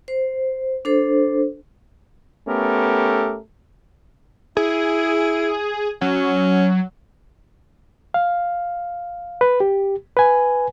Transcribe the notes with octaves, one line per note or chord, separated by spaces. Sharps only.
C5
D4 A4 C5
A3 B3 C#4 G4 A4 A#4
E4 G#4
F#3 C#4
F5
B4
G4
B4 G#5